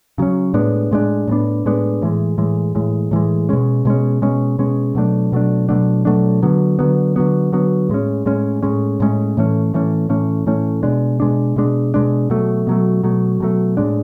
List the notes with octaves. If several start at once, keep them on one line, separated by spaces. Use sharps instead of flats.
C#3 F#3 C#4
A2 G#3 B3 D4
A2 G#3 B3 D4
A2 G#3 B3 D4
A2 G#3 B3 D4
A2 E3 G#3
A2 E3 G#3
A2 E3 G#3
A2 E3 G#3
B2 G#3 C#4
B2 G#3 C#4
B2 G#3 C#4
B2 G#3 C#4
B2 F#3 A3 D4
B2 F#3 A3 D4
B2 F#3 A3 D4
B2 F#3 A3 D4
D3 F#3 B3
D3 F#3 B3
D3 F#3 B3
D3 F#3 B3
A2 G#3 C#4
A2 G#3 C#4
A2 G#3 C#4
A2 G#3 C#4
A2 E3 A3 C#4
A2 E3 A3 C#4
A2 E3 A3 C#4
A2 E3 A3 C#4
B2 G#3 D4
B2 G#3 D4
B2 G#3 D4
B2 G#3 D4
B2 F#3 A3
B2 F#3 A3
B2 F#3 A3
B2 F#3 A3
A2 G#3 D4